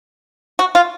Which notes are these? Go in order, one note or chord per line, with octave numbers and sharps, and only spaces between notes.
F#4
F4